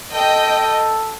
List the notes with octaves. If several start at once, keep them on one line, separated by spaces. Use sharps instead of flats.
A4 D#5 G5